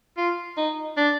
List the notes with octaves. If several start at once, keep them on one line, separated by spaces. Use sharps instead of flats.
F4
D#4
D4